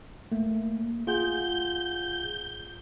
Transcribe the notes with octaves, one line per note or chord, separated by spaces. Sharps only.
A3 A#3
F4 G#4 F#5 G6